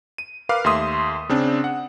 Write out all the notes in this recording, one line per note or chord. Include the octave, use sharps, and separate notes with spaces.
D#7
A#4 B4 F5 D6
D#2 A3 E5 C6 D#6
C#3 C4 D4
F#5